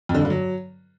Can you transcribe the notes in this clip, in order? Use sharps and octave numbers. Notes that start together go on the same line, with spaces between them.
F2
D3
G2
D3
F#3